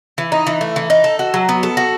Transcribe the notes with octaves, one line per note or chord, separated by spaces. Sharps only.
E3
D#4
E3
A3
E3
D#4
A4
F#4
F#3
B3
A4
F#4